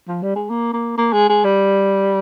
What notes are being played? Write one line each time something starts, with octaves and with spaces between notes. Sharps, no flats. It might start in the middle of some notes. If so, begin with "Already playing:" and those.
F3
G3
G#3
A#3
A#3
A#3
G#3
G#3
G3